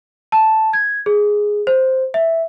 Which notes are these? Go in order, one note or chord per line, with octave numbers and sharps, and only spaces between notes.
A5
G#6
G#4
C5
E5